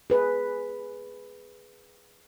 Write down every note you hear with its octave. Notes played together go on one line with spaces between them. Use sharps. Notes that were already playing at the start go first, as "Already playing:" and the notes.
G#4 B4